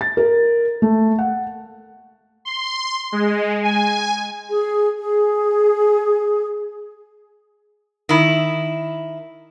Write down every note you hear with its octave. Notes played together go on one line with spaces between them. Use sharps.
A6
A#4
A3
F#5
C6
G#3
G#5
G#4
G#4
D#3 E4